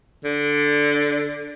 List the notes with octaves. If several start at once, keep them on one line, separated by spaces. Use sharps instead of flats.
D3